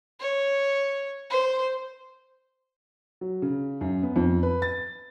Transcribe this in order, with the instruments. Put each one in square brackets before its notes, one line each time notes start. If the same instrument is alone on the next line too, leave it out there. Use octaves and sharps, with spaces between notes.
[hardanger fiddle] C#5
C5
[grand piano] F#3
C#3
F#2
B3
F2
B4
A6